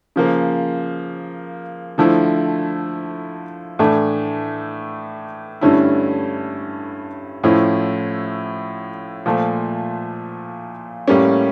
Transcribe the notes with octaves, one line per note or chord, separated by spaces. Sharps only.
C#3 F3 A#3
D3 F3 A3 E4
A2 E3 A3 D4
G2 D3 A3 C#4 E4
A2 F3 C#4 E4
A#2 F3 A3
A2 G3 A#3 C#4